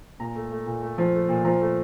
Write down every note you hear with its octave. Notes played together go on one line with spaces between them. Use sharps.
A#2 A#5
A3
A3
A#2
A3
F3
A3
A#2
F3 A#5
A3